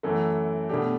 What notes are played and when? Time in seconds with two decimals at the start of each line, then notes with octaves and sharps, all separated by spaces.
0.03 F#2 E3 A3
0.69 B2 A3 D4 G4